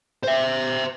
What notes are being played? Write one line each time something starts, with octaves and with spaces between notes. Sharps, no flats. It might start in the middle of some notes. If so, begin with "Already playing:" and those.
C5 E5